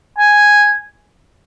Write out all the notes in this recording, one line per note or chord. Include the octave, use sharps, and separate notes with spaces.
G#5